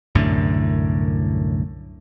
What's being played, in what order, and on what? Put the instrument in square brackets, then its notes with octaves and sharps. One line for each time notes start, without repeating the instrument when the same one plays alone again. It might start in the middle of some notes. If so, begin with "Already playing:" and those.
[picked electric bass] C2 F#2 A2 D3